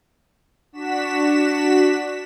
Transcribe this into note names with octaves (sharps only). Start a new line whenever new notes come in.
D4 F#4 B6 E7